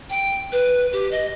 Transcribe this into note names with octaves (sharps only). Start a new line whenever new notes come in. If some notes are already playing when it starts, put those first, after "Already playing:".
G5
B4
G4
D#5